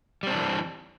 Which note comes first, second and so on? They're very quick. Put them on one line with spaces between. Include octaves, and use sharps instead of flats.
G3 C4 D4 E3